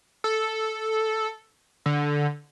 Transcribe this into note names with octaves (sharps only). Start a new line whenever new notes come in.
A4
D3